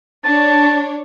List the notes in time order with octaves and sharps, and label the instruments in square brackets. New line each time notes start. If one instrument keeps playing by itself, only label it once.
[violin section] D4 C#5 [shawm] A5